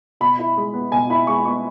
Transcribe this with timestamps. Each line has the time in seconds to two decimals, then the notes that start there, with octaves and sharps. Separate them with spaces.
0.20 B2 B5
0.39 E4
0.57 G#3
0.74 B3
0.92 B2 G#5
1.10 E4 B5
1.27 G#3 C#6
1.45 B3 C#6